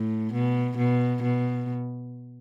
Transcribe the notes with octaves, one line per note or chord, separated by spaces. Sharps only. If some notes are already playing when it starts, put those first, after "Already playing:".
Already playing: A2
B2
B2
B2